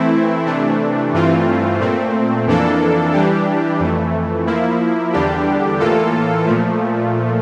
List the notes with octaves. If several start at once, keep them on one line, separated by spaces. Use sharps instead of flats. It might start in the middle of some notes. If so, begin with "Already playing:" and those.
Already playing: E3 A3 C4 E4
C3 E3 A3 D4
G2 E3 A3 C4 F4
A#2 A3 C4
F2 E3 A#3 D4 A4
E3 G3 D4 G4
F2 E3 A3
F3 A#3 E4
E2 D3 G3 D4 G4
A2 E3 A#3 F4 A4
A#2 F3 A3